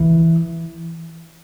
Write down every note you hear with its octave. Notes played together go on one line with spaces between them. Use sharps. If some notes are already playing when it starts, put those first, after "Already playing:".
Already playing: E3